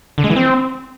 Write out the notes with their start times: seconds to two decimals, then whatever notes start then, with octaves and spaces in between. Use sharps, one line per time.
0.18 D3
0.24 G#3
0.30 E3
0.36 C4